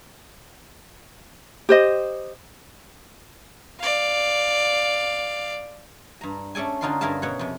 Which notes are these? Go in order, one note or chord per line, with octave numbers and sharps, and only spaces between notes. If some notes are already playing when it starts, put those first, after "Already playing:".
G4 C5 D#5
D5 F5
G2 A#5
A3 C#4 A4 D5 G#5
D3 C#4 D#4 F4 A#4 C6
G2 G#4 A#4 E5 F5 A5
B2 C#5 F#5
F2 C3